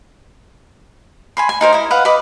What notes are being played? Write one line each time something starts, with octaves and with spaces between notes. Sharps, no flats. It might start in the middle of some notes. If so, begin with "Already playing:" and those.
G#5 B5 C6
G#5
D#4 A#4 C5
E4 D#5
B4 F5 F#5
B4 D#5 B5 D6